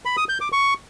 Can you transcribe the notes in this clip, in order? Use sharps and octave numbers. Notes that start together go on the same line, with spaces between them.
B5
D#6
G6
D6
C#6